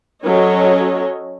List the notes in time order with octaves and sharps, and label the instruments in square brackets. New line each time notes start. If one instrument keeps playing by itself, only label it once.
[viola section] F#3 C#4 A4 C#5 D#5